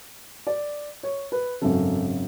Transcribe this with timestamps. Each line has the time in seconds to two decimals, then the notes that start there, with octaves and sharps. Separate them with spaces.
0.47 D5
1.03 C#5
1.32 B4
1.61 G#1 F#2 C#3 F#3 A4